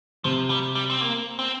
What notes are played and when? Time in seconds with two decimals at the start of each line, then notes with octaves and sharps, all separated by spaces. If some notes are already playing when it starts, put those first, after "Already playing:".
0.24 C3 F3
0.50 G3
0.75 G3
0.90 C4
1.01 A#3
1.39 C4